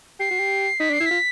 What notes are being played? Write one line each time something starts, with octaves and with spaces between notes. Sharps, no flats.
G4 C7
F#4
G4
D#4 B6
D4
C7
E4
F4 B6